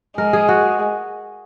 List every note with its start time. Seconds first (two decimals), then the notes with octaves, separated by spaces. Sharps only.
0.17 G#3 A#4
0.33 G#4
0.48 F#4